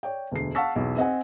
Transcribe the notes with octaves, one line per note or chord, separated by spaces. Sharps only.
C#5 D5 G5
E1 D2 C7
F5 F#5 A5 C#6 E6 B6
B1 E2
C4 D#5 F#5 G#5